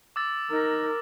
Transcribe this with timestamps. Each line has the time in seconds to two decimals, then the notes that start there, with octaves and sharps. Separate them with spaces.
0.16 D6 E6 A6
0.50 D#4 A#4